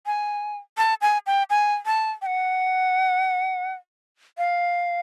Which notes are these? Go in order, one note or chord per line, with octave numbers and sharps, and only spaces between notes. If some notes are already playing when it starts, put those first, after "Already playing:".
G#5
A5
G#5
G5
G#5
A5
G5
F#5
F5